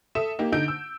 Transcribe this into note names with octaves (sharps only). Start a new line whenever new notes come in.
A4 E5 D#6 E7
A#3 D#4 G4
D3 D#4 G6 D7
E6